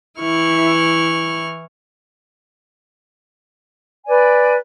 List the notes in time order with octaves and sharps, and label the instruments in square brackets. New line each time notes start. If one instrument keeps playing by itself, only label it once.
[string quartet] E3 E4 C#6 F6
[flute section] B4 D5 G#5